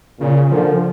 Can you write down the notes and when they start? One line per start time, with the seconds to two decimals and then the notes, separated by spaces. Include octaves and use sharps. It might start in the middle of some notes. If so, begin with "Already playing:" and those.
0.20 A#2 C#3
0.51 A#2 D3 F3